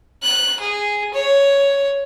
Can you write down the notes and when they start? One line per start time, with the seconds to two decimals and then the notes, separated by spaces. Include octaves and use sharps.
0.23 F#6
0.60 G#4
1.13 C#5